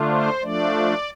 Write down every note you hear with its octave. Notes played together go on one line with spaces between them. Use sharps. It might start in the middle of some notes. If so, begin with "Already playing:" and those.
Already playing: D3 A3 D4 F4
C5
F3 A3 D4 D5